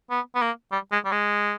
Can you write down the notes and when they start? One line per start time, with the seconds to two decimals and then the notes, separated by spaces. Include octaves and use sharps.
0.11 B3
0.35 B3
0.42 A#3
0.72 G3
0.92 G#3
1.05 G3
1.12 G#3